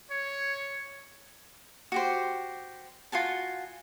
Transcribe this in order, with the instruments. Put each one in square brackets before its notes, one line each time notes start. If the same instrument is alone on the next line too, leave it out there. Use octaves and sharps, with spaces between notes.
[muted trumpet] C#5
[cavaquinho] F#4 G4 C5
F4 F#4 G#5 A5